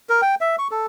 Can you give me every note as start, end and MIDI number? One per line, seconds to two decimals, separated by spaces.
0.09 0.21 70
0.22 0.35 79
0.41 0.56 76
0.59 0.68 85
0.71 0.86 69